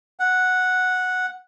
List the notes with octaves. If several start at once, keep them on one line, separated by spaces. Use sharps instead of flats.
F#5